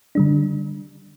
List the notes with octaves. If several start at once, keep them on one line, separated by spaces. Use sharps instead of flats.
D3 G3 D4